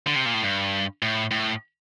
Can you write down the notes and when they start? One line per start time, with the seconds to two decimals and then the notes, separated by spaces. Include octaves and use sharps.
0.07 D3
0.16 C3
0.26 A#2
0.34 A2
0.43 G2
1.02 A2
1.31 A2